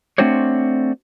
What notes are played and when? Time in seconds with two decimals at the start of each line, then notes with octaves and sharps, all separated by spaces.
0.18 A3 C4 D4 F#4 C5 C#5